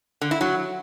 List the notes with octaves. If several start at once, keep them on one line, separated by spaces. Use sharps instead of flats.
D3
E4
F#3